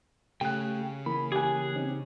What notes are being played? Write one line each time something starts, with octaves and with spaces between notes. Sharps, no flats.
C#3 A3 G4 G5 F#6
E3 A#3 B5
G4 G#4 G#5 F#6
C4 C#4 D#4